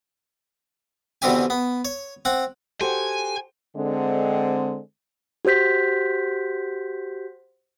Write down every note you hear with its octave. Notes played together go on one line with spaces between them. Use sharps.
E2 B2 D3 C4 G4 G#5
B3
C#5
C4 F#5
F#4 G4 A4 C5 G5 G#5
D3 G#3 C4
F#4 G4 C5 G6 B6